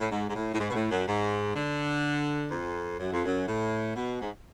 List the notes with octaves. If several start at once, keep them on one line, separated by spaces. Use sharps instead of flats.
A2
G#2
G#2
A2
A2
G#2
B2
A2
F#2
G#2
D3
F2
F#2
F2
F#2
A2
B2
G#2